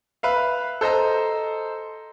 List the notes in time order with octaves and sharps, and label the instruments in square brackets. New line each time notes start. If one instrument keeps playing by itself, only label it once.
[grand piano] B4 E5 F5
A4 C5 D#5 A#5